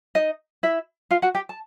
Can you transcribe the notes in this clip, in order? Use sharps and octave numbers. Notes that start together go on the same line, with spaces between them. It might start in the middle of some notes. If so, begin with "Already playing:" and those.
D#4 D#5
E4 E5
F4 F5
F#4 F#5
G4 G5
A5